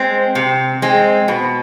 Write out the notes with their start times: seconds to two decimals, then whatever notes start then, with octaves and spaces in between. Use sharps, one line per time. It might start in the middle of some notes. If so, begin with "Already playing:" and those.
Already playing: G#3 C4
0.35 C3
0.82 G#3 C4
1.28 B2